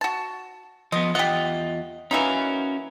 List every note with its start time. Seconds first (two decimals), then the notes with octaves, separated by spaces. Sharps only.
0.01 F#4 A5
0.92 F3 B3 D#5
1.15 E2 F4 G4 D#5 F#5
2.11 E3 A#3 C#4 D#4 F#4 A#4